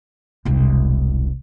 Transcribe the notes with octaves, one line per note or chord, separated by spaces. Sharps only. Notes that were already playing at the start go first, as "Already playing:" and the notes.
E1 C2